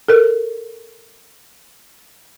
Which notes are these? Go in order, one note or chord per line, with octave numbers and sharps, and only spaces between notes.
A4 A#4